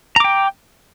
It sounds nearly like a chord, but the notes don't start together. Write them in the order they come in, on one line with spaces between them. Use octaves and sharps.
A#5 D6 G5